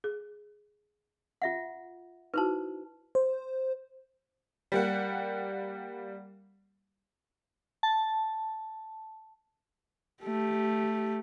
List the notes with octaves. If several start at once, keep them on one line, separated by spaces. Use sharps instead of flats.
G#4
F4 E5 F#5
D#4 E4 F#4 B4 C5 A5
C5
G3 A#3 F#5
A5
A3 G4